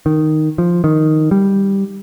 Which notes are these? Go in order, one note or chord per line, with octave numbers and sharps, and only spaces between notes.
D#3
F3
D#3
G3